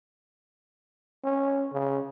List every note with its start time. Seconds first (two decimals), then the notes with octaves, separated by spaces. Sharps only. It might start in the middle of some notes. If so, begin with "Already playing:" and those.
1.24 C#4
1.72 C#3